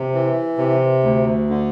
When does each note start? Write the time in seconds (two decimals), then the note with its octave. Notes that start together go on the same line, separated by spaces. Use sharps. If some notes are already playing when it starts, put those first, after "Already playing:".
Already playing: C3
0.14 E3
0.58 C3
1.04 D2
1.49 D3